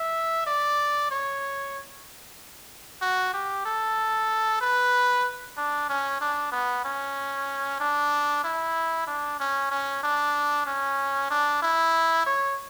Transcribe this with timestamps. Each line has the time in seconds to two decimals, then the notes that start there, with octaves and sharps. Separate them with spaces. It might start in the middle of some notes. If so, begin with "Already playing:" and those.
Already playing: E5
0.46 D5
1.11 C#5
3.02 F#4
3.33 G4
3.65 A4
4.61 B4
5.57 D4
5.89 C#4
6.21 D4
6.52 B3
6.85 C#4
7.80 D4
8.44 E4
9.07 D4
9.40 C#4
9.71 C#4
10.03 D4
10.66 C#4
11.30 D4
11.62 E4
12.26 C#5